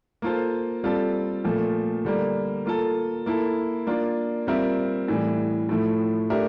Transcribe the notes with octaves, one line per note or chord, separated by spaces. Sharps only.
A#3 F4 A4 C5
G3 C4 F4 A4
A#2 F3 A3
D3 G3 A#3
A#3 F4 A4
A#3 E4 A4
A#3 D4 F4
G3 C4 F4 A#4 E5
A2 E3 G3
A2 F3 A3 E4
A3 D4 G4 A#4 E5